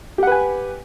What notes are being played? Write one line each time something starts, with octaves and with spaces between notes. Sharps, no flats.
G4 B4 F#5 G#5